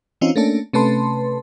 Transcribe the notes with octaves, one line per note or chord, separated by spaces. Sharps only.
E3 C4 C#4 D#4 F4
A3 A#3 C#4 D4 A4
C3 A3 C#4 B4 A5 C6